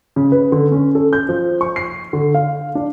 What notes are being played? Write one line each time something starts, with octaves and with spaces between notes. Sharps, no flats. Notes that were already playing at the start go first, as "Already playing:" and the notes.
C#3
B4
D3
C#4
A4
G6
F3
C#6
C7
D3
F5
D4